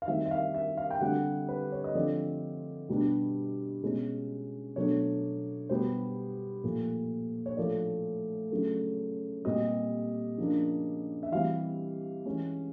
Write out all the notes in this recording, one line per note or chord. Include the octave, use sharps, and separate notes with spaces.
F5
D#3 G3 C4 E5
E5
F5
E5
F5
G5
D3 G3 C4 F#5
B4
C#5
D#5
D3 F3 A3 C4 D5
B2 G3 B3 D4
B2 G#3 C#4
B2 F#3 A3 D4 C#5
B2 G3 B3 C5
A#2 F3 A3
C#5
A2 F3 A3 D5
C#3 F#3 A3
A#2 G3 C4 D#5
C#3 F3 A#3 D4
E5
E3 G3 C4 F5
E3 G#3 C#4